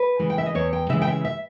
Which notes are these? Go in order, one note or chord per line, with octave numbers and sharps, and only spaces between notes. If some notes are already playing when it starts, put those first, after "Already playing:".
Already playing: B4
C#3 E3 G#3
G5
E5
D#5
E2 C#5
G5
C#3 E3 G#3 E5
G5
E5
E5